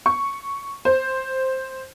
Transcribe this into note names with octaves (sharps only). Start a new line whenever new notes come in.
C#6
C5